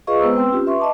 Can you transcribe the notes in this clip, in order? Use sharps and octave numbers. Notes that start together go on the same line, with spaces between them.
F4 G#4 B4 D#5 F5 C#6
G#3 B3 B4 C5 A#5 E6
C4 B4 G5 C6 E6
C#4 F4 G4
B4 E5 C6 C#6
D#5 A5 D6